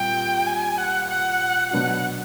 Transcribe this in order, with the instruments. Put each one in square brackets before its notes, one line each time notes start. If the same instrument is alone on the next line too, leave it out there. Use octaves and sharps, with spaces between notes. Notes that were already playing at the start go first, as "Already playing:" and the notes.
Already playing: [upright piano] A#2 G3 C4 [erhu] G5
[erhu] G#5
F#5
F#5
[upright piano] B2 F#3 B3 D4 F#4 [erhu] F#5